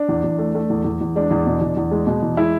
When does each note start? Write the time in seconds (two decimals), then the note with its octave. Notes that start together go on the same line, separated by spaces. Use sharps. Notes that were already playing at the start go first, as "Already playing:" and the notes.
Already playing: D4
0.09 E2
0.24 E2
0.39 A3
0.55 A3
0.70 E2
0.84 E2
1.01 E2
1.16 G#3 D4
1.30 E2
1.47 B2
1.61 E2
1.77 E2
1.91 G#3
2.07 B2
2.22 E2
2.37 G#3 E4